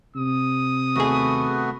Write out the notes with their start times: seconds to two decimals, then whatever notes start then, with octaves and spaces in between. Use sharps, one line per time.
0.16 C3 D#6
0.96 D#2 A3 B3 F#4 G#4